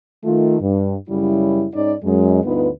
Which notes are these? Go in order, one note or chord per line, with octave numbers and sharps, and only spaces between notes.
D#3 A3 F4
G2
F#2 C#3 G3 E4
G#2 C#4 D#4 D5
F#2 G#3
D2 G2 B3 D#4 F4 B4